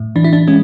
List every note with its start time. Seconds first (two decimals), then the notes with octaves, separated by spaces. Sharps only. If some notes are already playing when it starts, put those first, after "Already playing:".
Already playing: A2
0.16 E3 D4
0.24 E4
0.33 D4
0.48 G#3 C#4